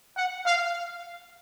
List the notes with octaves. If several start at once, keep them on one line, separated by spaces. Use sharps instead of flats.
F#5
F5